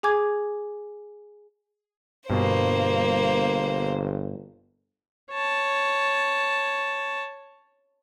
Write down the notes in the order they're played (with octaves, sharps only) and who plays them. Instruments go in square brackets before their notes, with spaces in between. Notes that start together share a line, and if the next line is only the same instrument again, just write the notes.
[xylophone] G#4 G#5 D6 G#6
[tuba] G1 [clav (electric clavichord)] G2 B2 [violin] A#3 C5
[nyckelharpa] C#5 A5